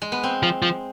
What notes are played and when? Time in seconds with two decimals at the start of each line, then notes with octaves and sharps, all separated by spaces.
0.02 G#3
0.12 B3
0.23 C4
0.43 F3
0.62 F3